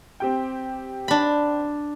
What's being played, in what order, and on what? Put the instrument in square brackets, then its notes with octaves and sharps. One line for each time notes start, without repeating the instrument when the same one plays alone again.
[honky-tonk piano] C4 G4 G5
[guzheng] D4 B5